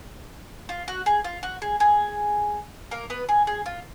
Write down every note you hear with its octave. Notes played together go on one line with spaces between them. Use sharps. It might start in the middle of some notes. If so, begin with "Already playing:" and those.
F4
F#4
G#4
F4
F#4
G#4
G#4
A#3 A#4
B3 B4
G#4
G#4
F4